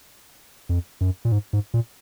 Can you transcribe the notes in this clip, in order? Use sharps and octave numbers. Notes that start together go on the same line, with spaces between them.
F2
F#2
A#2
G#2
G#2
A#2